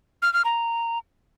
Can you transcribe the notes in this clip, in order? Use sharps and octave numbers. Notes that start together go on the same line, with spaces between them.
F6
F6
A#5